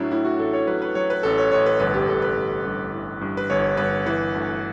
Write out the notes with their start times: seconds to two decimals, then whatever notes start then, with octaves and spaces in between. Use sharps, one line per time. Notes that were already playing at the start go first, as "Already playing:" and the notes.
Already playing: A2 F#3 D4 E4
0.12 A2 E4
0.25 F#4
0.39 A1 A4
0.53 C#5
0.67 F#3 B4
0.82 B4
0.95 F#3 C#5
1.10 B4
1.23 A1 A4
1.38 C#5
1.51 A1 C#5
1.66 B4
1.80 G1 B4
1.94 G4
2.08 G1 A4
2.22 B4
2.37 G1
2.65 G2
2.93 E3
3.21 G2
3.37 B4
3.50 G1 C#5
3.77 G1 B4
4.06 E3 B4
4.34 D2